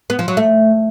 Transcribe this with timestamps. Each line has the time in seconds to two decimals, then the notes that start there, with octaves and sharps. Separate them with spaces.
0.10 B3
0.19 F3
0.28 F#3
0.37 A3